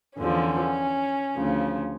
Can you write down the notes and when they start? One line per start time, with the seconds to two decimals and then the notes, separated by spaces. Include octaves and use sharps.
0.18 E2 D3 F3 C#4
1.36 D2 C#3 F3